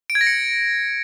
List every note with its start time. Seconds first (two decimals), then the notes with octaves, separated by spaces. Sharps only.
0.10 D7
0.15 G#6
0.21 A#6
0.27 C#7